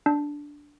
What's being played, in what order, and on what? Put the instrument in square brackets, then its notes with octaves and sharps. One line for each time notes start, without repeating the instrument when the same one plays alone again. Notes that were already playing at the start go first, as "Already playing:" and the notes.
[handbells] D4